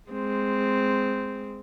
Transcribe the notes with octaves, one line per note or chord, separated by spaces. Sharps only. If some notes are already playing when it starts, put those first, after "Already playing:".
G#3 C4